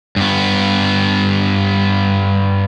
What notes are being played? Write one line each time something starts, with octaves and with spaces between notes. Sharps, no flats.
G2 B3